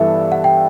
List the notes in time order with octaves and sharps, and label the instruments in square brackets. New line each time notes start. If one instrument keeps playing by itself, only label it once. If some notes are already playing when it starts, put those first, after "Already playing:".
Already playing: [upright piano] G2 E3 B3 E4 A4 [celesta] E5
[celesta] F#5
G5